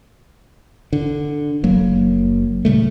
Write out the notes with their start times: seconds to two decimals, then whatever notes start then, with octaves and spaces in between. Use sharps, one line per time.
0.93 D3
1.64 F#1 F#3 A#3
2.65 A#2 C#3 G3 A3